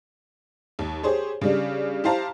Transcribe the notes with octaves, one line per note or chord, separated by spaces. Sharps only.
D#2
G4 G#4 C5 C#5
C#3 G3 D4
E4 G4 C5 F5 A5 A#5